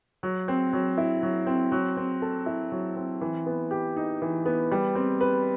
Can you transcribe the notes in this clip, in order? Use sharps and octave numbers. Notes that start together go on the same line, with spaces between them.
F#3
C4
F#3
E4
F#3
C4
F#3
C4
A4
E4
F#3
C4
E3
B3
G4
D#4
E3
B3
G3
C4
B4